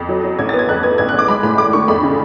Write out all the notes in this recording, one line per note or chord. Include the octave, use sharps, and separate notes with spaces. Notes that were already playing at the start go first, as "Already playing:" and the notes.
Already playing: F2
F#3
F#3
A1 G#6
A6
B3
G#6
F2 F#6
B3 G#6
A1 G#6
F#6
A1
D6
G#3 B5
A2 B5
G#1 D6
D3 C#6
F2 B5
C#3